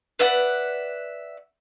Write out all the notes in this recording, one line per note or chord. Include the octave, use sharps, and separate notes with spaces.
B4 D5 E5 F#5